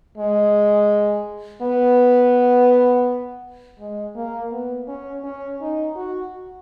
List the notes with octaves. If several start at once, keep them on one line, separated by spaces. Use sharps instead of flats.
G#3
B3
G#3
A#3
B3
C#4
C#4
D#4
F#4